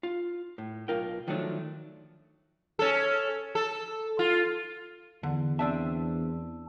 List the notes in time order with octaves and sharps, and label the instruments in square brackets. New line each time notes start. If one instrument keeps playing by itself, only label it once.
[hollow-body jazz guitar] F4
A2
B1 F4 A#4 G5
D#3 F3 F#3 A3 B3 D4
[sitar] C#4 A4
A4
F4
[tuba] E2 [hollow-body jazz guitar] D3
[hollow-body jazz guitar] C4 D4 E5 [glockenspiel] A5 E6